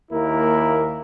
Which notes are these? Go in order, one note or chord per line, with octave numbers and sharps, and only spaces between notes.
D#2 A#3 E4 A#4